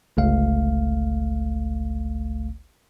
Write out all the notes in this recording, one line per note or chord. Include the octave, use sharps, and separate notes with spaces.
G1 C#2 A3 F5